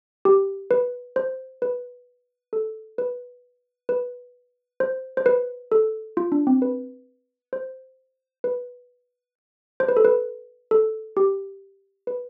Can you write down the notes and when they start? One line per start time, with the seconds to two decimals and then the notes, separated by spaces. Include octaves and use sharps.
0.25 G4
0.71 B4
1.16 C5
1.62 B4
2.53 A4
2.98 B4
3.89 B4
4.80 C5
5.17 C5
5.26 B4
5.72 A4
6.17 F4
6.32 D4
6.47 C4
6.62 B4
7.53 C5
8.44 B4
9.80 C5
9.88 B4
9.97 A4
10.05 B4
10.71 A4
11.17 G4
12.07 B4